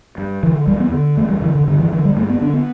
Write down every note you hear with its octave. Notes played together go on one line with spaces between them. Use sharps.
G2
D3 E3
E2 G3
B3
D3
E2 A3
G3
D3 E3
D3
G2 D3
E3
D3 E3
G3
G2 A3
B3
D3 D4
B3